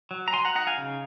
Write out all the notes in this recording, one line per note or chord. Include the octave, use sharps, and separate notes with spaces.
F#3
A#5
F#3 G#5 C6
F#5 A#5
D#4 F#5 A#5
F5 G#5
C#3